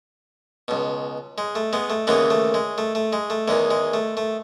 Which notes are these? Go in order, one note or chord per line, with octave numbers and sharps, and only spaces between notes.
C#2 B2
G#3
A3
G#3 B3
A3
D#2 C#3 E3 G#3 B3
A3
G#3
A3
A3
G#3
A3
E2 D#3 G#3
G#3
A3
A3